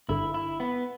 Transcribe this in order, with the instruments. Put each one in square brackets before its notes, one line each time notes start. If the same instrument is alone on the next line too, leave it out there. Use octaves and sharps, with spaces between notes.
[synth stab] G1 G2 D3 [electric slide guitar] E4
[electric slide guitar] E4
B3